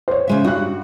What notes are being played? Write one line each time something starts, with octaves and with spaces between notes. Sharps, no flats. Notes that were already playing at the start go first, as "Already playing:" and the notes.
C5 C#5
C#3 G#3 E5
G2 F#4 F#6